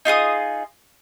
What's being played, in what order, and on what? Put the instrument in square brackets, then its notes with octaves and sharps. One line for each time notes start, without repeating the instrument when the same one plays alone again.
[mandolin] D#4 F4 G#4 D#6